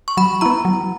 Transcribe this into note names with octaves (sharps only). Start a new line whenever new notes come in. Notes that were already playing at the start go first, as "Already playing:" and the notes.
C#6
F#3 B5
B3 E4 A#5
F#3